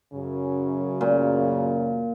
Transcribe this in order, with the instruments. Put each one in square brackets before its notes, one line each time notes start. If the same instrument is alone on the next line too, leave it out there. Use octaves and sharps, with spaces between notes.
[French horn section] F#2 C#3
[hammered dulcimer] A#2